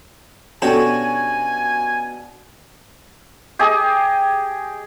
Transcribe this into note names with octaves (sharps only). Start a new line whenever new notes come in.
B2 C#4 D4 F#4 G4 A4 G#5
G4 G#4 D#5